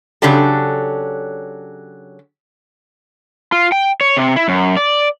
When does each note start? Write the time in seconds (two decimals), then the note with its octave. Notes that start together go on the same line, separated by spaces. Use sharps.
0.22 C#3 F#3 D4 G4 A4
3.52 F4
3.72 G5
4.01 C#5
4.17 C3
4.36 E4
4.48 F#2
4.77 D5